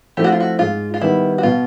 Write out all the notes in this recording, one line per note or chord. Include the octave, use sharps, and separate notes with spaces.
F3 A3 C4 E4 G4
F#4
F4
F#4
G#2 F4
F4
D#3 G3 B3 E4
F#4
B2 F4